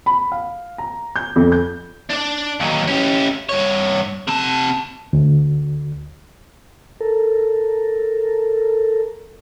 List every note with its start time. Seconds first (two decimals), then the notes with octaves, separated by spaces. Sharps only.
0.06 B5
0.32 F5
0.78 A#5
1.16 G6
1.36 F2
1.52 G6
2.10 D4 D5
2.60 D#2 F#3
2.88 C#4 G4
3.49 G2 C#5
4.28 C3 A5
5.13 D2
7.01 A4 A#4